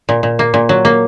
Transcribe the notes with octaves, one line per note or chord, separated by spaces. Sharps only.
A#2
A#2
A#3
A#2
F#3
A#3